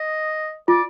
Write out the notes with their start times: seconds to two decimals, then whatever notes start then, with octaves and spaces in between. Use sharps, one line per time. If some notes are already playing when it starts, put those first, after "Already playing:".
Already playing: D#5
0.68 F4 D5